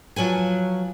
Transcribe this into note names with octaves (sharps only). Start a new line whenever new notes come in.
F3 F#3 B4 G#5